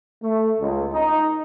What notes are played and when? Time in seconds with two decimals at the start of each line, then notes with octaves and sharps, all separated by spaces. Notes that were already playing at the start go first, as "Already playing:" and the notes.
0.23 A3
0.60 C#2
0.94 D#4